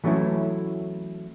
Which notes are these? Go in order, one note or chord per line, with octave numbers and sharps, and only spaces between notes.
E3 F#3 A3 C#4 E4